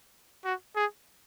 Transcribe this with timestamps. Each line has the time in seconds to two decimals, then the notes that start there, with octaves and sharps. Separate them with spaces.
0.44 F#4
0.76 G#4